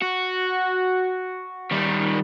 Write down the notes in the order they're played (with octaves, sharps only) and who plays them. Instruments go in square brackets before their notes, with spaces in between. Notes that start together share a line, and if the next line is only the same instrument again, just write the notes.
[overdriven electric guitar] F#4
D#3 G3